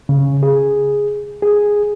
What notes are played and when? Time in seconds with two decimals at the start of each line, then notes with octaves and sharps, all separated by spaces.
0.09 C#3
0.43 G#4
1.43 G#4